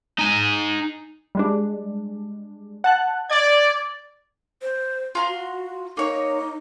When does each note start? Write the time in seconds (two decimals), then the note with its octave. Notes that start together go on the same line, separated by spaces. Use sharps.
0.19 D#4 G#5
1.35 G3 G#3 D4
2.84 F#5 A5 F#6
3.30 D5 G#6
4.62 C5
5.15 F4 A#5 C6
5.28 F#4
5.97 A#3 D#4 C#5